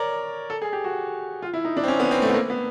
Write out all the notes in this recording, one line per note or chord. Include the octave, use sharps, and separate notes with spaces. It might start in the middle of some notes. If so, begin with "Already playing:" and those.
Already playing: A#4 C#5 D5
A4
G#4
G4
F#4
F4
E4
D#4
D4
C4
C#4
B3
C4
A3
B3
A#3
B3